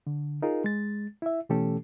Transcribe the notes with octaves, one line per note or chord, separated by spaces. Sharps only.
D3
D#4 F4 G#4 A#4
G#3 A6
E4 E5
B2 E3 A3 C#4 G4 A4